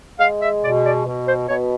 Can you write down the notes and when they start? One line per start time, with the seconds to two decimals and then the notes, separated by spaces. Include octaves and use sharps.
0.19 G#3 F5
0.41 E5
0.63 B2 D5
0.84 D5
1.06 B2
1.26 C5
1.48 B2 C#5